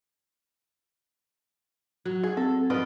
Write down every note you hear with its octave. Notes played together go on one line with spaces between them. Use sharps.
F#3
G#4
C4 A4
F3 F4 B4 D5 D#5